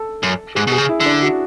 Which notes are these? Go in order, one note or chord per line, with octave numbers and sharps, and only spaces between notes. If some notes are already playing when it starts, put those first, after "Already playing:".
Already playing: A4
F#2
G#2 G#4
B2 G#4
C#3
E4
D3
D4
F#4